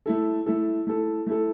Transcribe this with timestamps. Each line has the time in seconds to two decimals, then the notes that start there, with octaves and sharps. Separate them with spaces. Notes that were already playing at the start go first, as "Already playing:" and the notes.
0.06 A3 E4 A4
0.46 A3 E4 A4
0.87 A3 E4 A4
1.27 A3 E4 A4